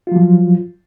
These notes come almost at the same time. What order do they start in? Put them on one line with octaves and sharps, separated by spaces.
F4 F#3 F3